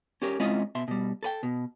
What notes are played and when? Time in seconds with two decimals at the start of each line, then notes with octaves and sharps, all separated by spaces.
0.22 C#4 G4 A#4 B4 C#5
0.40 G#3 C4 C#4 E4 F4 D#5
0.75 B2 E5 C6
0.88 B2 G3
1.23 A4 B4 G5
1.43 B2